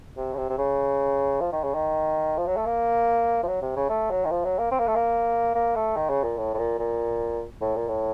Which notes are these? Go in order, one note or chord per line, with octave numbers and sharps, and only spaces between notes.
C3
C#3
C3
C3
C#3
F3
D#3
C#3
D#3
F3
F#3
A3
A#3
F3
F#3
C3
C#3
A3
F#3
D#3
F3
F#3
A#3
C4
A#3
A3
A#3
A#3
A3
D#3
C#3
A#2
A2
A2
A#2
A#2
A2
A#2
A2